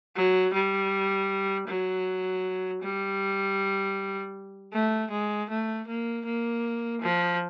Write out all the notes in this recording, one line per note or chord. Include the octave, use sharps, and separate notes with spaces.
F#3
G3
F#3
G3
A3
G#3
A3
A#3
A#3
F3